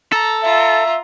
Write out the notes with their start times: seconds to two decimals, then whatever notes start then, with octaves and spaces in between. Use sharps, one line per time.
0.12 A4 A#5
0.43 F4 E5 A#5